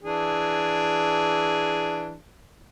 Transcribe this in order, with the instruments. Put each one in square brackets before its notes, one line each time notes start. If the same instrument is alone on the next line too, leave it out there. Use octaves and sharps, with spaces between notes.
[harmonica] E3 D4 G#4